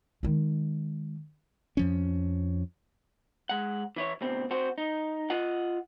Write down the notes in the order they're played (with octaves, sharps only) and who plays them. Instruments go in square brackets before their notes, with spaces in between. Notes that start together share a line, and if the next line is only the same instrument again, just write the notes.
[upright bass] D#3 G#3
[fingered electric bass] F2 F3 C#4
[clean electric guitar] G#3 F#5
E3 E4 C#5
D2 B2 C4
C4 F#4 C5
D#4
F4 D#5 F#5